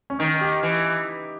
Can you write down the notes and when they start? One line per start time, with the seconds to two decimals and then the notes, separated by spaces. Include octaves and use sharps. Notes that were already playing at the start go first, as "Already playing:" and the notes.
0.10 C#4
0.19 D#3 D#4
0.41 G4
0.63 E3